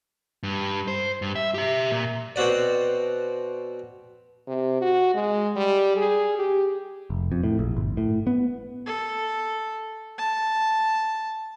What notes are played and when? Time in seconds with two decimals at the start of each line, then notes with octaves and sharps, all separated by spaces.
0.43 G2
0.88 C5
1.22 G2
1.36 E5
1.54 G4 E5
1.91 A#2
2.36 B2 C4 F#4 D5
4.47 C3
4.81 F#4
5.14 G#3
5.56 G3
5.96 G#4
6.39 G4
7.10 F1
7.32 F2
7.43 A2
7.59 A#1
7.77 G1
7.97 A2
8.27 B3
8.86 A4
10.18 A5